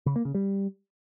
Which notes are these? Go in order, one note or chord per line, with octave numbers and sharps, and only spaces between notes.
C#3
A#3
C#3
G3